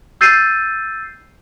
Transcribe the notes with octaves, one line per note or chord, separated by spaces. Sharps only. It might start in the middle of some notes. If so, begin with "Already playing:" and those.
E6 G6 A6 C7 D#7